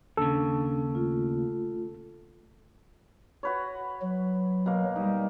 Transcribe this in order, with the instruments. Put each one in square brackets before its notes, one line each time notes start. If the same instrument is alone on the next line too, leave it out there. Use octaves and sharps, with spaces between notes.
[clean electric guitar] D#2 C#3 [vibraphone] D4 [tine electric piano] A4
[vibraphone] A3 F4
[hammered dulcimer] F#4 B4 C#5
[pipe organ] F#3
[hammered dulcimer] B2 A#3
[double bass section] G3 [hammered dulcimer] D#4